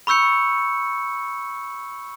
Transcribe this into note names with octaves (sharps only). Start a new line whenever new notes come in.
B5 C#6 E6 G6 C#7